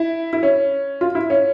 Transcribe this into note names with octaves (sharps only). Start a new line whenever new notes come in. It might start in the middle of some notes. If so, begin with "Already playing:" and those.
Already playing: E4
E4
C#4
F4
E4
C#4